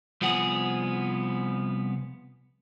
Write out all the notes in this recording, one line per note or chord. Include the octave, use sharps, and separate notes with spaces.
C2 F3 B3 G#4 F#5